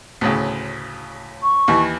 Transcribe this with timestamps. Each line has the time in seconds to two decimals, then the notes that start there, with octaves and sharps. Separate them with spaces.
0.21 D2 A2 C#3
1.43 C#6
1.68 D#2 E3